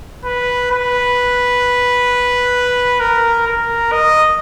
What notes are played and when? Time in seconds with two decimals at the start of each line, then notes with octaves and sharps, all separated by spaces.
0.25 B4
0.71 B4
3.00 A#4
3.47 A#4
3.92 D#5